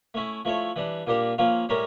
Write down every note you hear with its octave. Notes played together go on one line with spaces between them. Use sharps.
A3 C#4 E4
F3 A3 E4 A4 C#5
E3 G3 D4
A#2 G3 A#3 D4 G4
F3 A#3 C#4 F4
A2 G3 C#4 G4 A#4